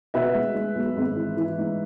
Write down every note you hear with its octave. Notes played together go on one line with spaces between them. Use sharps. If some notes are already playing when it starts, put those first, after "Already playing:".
B2 B4 E5
G#3
G#3
B1
G#1
E3
E3
G#2